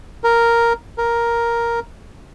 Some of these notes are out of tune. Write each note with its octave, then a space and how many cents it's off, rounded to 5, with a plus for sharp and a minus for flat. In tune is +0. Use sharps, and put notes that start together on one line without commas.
A#4 +0
A#4 +5